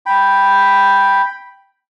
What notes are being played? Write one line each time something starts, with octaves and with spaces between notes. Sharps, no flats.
G5 B5